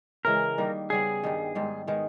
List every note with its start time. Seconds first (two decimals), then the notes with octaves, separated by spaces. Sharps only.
0.25 C#3 E3 G#3 A#4
0.58 D#3 G3 A#3
0.90 C#3 G3 B3 G#4
1.23 G2 D#3 G3
1.55 G#2 D#3 G3
1.87 D#3 G#3 B3